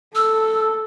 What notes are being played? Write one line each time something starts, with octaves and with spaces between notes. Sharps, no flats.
A4 E6